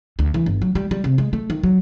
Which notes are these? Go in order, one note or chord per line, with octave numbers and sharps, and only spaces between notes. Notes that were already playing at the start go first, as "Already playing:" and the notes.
D2
E3
G1
F#3
G3
G3
C3
G#3
A3
D#3
F#3